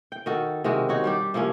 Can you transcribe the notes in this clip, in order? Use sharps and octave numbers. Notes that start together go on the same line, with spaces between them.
G5
D#3 F#4 A4
C3 D#3 G#3 F#4
D#4 F#4 C#5
G3 D4 G4
C3 F3 A#3 C#4